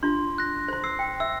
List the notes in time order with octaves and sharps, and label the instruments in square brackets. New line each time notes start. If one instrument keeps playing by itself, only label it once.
[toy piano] D4 F4 [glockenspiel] C6
[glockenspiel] F#6 A#6
[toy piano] C5 C6
[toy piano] E6 [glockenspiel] C7
[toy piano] G5
[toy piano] E5 [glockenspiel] E6